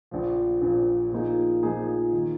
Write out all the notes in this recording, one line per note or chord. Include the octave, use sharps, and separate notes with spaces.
A#1 A#2 F3
A#1 A#2 F3
A#2 F3 A#3 D#4 G#4
A#2 F3 A#3 D#4 G#4
D#3